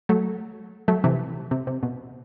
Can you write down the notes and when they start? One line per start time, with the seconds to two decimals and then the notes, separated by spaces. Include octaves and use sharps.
0.09 F#3 A3
0.88 F#3 A3
1.04 C3 E3
1.51 C3
1.67 C3
1.83 B2